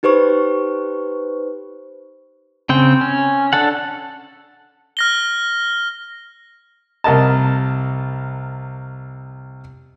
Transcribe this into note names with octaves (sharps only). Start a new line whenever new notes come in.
D#4 G4 B4 C5 C#6
C#3 C4 G5
C#4
D4 A4 F#5
F6 A#6 G7
C2 A#4 D#5 A5